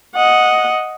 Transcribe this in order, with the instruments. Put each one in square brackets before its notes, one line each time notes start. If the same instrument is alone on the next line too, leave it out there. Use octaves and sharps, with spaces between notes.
[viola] D#5 F#5